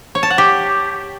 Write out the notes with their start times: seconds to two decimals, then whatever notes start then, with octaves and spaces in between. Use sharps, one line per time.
0.15 C#5
0.23 A5
0.30 F#5
0.38 G4